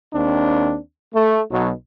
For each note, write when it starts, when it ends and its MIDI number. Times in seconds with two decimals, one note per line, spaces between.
0.13 0.79 39
0.13 0.79 60
0.13 0.79 62
1.14 1.41 57
1.52 1.72 35
1.52 1.72 47
1.52 1.72 54